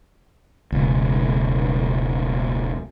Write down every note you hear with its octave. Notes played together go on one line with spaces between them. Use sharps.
E1 C#2